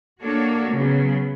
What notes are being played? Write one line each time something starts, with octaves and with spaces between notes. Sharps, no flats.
A#3 D4 F#4 A4 C#5
C#3 F#3 B3